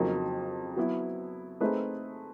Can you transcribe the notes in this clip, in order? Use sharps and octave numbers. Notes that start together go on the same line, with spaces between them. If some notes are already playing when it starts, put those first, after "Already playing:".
Already playing: F2 C#3 F#3 A#3 D#4
F#3 B3 E4
A3 C4 D#4 G#4 B4